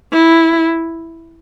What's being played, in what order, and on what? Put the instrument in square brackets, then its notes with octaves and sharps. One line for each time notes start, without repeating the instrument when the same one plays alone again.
[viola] E4